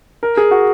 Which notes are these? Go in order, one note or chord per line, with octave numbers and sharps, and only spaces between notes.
A#4
G#4
F#4